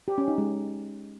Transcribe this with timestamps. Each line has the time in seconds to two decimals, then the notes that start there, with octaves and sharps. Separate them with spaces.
0.08 G4
0.18 C#4
0.28 D#4
0.38 G#3